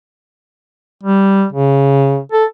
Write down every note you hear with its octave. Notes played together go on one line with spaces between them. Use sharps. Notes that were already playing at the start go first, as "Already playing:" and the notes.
G3
C#3
A4